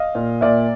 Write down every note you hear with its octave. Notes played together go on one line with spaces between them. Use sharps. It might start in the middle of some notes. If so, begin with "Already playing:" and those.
Already playing: D#5 F5
A#2
A#2 D5 E5